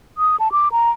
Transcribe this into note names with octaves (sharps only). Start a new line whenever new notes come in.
D#6
A5
D6
A#5